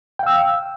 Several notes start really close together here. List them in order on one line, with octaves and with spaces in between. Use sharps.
G5 F5 E6